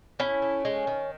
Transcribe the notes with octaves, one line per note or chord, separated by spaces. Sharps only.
A3 C#4 E4
A3
G#3
D#3